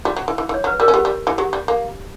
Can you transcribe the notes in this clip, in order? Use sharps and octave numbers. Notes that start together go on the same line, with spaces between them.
G3 F#4
F#3
E3
E3
E3
C#5
F#3
B4
G3 A#4
C#4
B3 G4
G3
E3
F#3 G4
G3
A#3